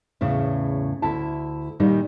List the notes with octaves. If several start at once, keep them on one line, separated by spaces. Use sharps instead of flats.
E2 A2 C#3
D2 E4 A5
A#2 D#3 G3 D#4